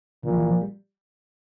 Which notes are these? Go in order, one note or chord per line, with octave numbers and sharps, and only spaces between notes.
A#2 D3
F3
E3
F3
G3